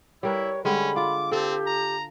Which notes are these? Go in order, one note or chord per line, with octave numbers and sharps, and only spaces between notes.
G3 E4 A#4 B4 C#5
D3 G3 G#3 C#4 B5
F4 D6
C4 G4 A4
A#5